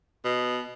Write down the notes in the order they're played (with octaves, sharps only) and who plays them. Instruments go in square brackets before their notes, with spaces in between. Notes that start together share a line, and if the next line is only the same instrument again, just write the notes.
[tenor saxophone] B2